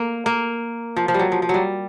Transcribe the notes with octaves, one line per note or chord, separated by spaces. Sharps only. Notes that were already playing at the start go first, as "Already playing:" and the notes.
Already playing: A#3
A#3
F3
F3
G3
F#3
F3
F3
F#3 G3